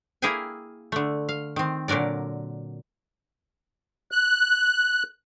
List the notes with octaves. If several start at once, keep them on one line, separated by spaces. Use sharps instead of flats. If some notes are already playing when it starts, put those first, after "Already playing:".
A#3 E4 G#4 F5 G5 G#5
D3 A3
F5
D#3 C4
A#2 D3 F#3 A#4 D5
F#6